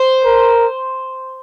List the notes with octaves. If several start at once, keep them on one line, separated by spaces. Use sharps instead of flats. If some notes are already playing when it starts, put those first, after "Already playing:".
Already playing: C5
A#4